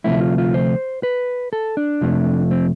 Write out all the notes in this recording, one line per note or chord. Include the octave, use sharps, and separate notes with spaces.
D2 C3 F3 A3 E4
F4
F4
C5
B4
A4
D4
F2 C3 F3 A3
C4